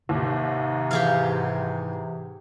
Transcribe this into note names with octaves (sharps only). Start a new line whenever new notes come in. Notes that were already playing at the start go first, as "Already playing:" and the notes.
D#2 G#2 C3
E3 G4 G#4 F5